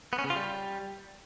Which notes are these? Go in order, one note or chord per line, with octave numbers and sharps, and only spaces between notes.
B3
C#4
C#3
F4
G3